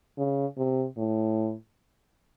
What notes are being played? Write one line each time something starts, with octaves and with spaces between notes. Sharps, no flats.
C#3
C3
A2